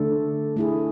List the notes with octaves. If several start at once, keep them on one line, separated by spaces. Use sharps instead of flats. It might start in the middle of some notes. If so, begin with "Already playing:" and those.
Already playing: D3 A3 D4 A4
A3 E4 G#4